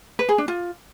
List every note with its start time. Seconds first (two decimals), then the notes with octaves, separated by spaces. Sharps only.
0.19 B4
0.29 G#4
0.38 D4
0.48 F4